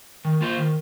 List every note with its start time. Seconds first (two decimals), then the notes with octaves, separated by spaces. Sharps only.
0.25 D#3
0.41 A#3 F4 C5
0.58 D#3